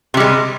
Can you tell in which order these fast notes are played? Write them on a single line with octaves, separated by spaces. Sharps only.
C3 G3 G#3